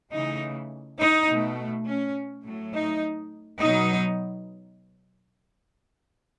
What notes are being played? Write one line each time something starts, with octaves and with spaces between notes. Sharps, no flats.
C#3 E3 A3 D#4
D#4
B2 A3
C#4
A2 F#3 A3
D#4
B2 F#3 B3 D#4